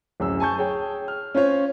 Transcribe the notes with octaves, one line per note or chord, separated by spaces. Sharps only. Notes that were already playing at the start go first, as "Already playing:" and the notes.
D1 F#2 E6
G#5 A5 C#6 G6
G#4 C#5 G5
F6
C#4 F4 C5 C#5